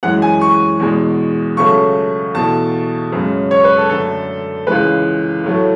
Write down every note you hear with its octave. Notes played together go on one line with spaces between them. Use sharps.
F#2 E3 G#3 F#5
G#5
C#6
E2 B2 G#3
C#2 C#3 F#3 A3 C#6
E2 B2 A3 A5
F#2 C#3 G#3
C#5
B4
A4
F#2 D3 A3 A4
C#2 C#3 E3 G#3 B4
A2 F#3 A3